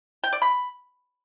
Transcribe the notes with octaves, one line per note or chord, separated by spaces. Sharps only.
G5
D5
B5